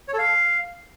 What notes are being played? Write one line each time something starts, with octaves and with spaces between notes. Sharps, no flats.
C#5
A4
F5